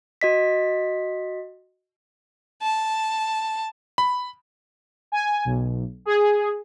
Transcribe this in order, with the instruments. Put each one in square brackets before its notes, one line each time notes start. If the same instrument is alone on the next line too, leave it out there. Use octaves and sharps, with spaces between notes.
[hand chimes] F#4 D#5 B6
[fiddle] A5
[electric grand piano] B5
[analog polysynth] G#5
B1
G#4